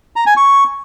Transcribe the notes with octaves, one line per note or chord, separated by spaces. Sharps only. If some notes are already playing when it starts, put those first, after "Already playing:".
A#5
G#5
C#6